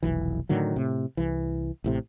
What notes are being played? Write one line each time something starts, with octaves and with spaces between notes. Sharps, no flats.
F1 B1 E3
A2 D3 D#3 F#3
A2 C3
C2 E3
A1 A2 C3